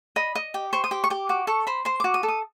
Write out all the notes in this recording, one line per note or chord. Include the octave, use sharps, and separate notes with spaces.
D#5 B5
D#5
G4
C5 C#6
D#6
G4 D6
C#6
G4 D6
F#4 D6
A4 C#6
C5 B5
C5 C6
F#4 D6
D#6
A4
D#6